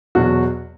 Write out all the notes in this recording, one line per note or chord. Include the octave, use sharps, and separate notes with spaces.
E2 B2 F#3 F#4